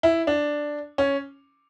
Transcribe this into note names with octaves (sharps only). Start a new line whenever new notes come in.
E4
D4
C#4